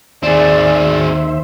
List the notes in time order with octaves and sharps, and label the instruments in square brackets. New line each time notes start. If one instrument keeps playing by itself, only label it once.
[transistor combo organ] D#2 C5 E5 [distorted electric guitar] C4 G#4 [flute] D5